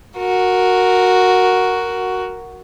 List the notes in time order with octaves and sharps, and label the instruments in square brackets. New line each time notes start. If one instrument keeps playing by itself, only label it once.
[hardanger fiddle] F#4 A#4